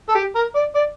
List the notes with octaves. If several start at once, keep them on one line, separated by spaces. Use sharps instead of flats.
A4
G4
A#4
D5
D5